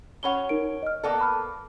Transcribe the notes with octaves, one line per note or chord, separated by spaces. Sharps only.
F#3 C#4 C#5 F#5 B5 G7
D#4 A#4 D7
D#5 F6
A#3 B3 A4 D5
B5 F6